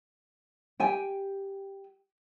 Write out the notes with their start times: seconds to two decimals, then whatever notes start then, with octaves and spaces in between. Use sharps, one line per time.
0.80 G4 G5 G#5